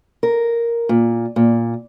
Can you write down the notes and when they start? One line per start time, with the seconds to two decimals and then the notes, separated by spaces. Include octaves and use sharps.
0.23 A#4
0.89 A#2
1.36 A#2